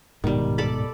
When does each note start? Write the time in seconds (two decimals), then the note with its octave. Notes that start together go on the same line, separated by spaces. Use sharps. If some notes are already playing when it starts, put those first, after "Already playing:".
0.24 D1 G#2 B2 D#3 G3
0.58 A4 D5 B5